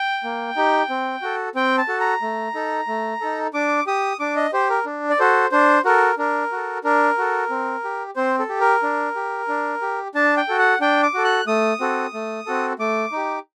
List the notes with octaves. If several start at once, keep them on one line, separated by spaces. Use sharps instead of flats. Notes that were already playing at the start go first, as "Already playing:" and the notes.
Already playing: G5
A#3
D#4 G4
C4
F#4 A4
C4 G5
A5
F#4 A4
A#5
A3
D#4 A4
A3
D#4 A4
D4 D6
G4 D#6
D4 D6
D#5
G4 C5
A#4
D4
D5
F#4 A4 C5
D4 C5
F#4 A4 A#4
D4 A#4
F#4 A4
D4 A#4
F#4 A4
C4
G4
C4 C5
A4
G4
A#4
D4
G4
D4
G4
D4 A5
G5
F#4 A4
F#5
D4 G5
D6
F#4 A4
F#6
A3 D#6
C4 F#4 A4
A3
C4 F#4 A4
A3 D6
D#4 G4